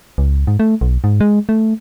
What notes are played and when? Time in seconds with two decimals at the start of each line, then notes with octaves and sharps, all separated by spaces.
0.18 C#2
0.47 G#2
0.60 A3
0.81 B1
1.04 G#2
1.20 G#3
1.49 A3